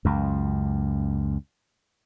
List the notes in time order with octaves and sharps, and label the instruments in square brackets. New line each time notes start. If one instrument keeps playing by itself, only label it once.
[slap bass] C#2 F#2